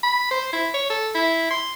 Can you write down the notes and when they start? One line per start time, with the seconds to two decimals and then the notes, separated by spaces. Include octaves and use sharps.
0.03 B5
0.31 C5
0.53 E4
0.74 C#5
0.90 A4
1.15 E4
1.50 C6